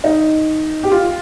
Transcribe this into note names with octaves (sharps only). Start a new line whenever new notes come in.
D#4
G4
F4